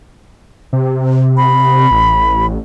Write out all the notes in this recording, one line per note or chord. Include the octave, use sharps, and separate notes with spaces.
C3
B5
A1